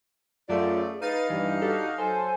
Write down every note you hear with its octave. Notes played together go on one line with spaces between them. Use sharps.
F#2 A3 F4 G#4 D5
D#4 B4 F5 A6 C7 D#7
G2 E3 G4
D4 F#4 G4 A4
F#3 A4 C5 G#5